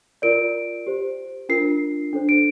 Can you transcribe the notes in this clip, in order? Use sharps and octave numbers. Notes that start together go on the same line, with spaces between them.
F4 A#4 D5 D7
G4 C5
D4 F4 A#4 C7
D4 A4 C5
D7